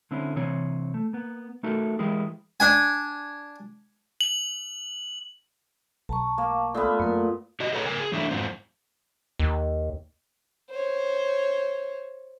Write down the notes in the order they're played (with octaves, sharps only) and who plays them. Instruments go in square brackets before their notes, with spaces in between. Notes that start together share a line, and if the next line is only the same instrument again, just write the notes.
[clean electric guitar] D3 C4 C#4 E4
C3 E3 C4 C#5
A3
A#3 B3
A3 D#4 F#4 A4 A#4 E5
E3 G#3 E4 G4 G#4 A#4
[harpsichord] D4 G#5
[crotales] F#7
[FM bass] B1 [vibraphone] A5 A#5 C#6
[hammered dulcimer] A#3
[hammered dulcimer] A#2 A3 B3 [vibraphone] A4 B5
[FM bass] F#2 [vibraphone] A#3 A#4
[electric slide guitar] F#4 G4 D#5
G#4 A4 B4 C#5 F#5 A#5
C#3 A#4 G#5
G#4
E3 A3 D4 E4 E5
F2 G#2 C4
[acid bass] D#2
[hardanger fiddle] C5 C#5